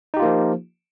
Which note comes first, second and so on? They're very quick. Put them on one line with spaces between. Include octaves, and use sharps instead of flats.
D#4 G4 F4 A#3 F3